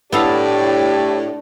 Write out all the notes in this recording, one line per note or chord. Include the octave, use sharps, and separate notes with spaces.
A2 B3 D4 G4 A4 F5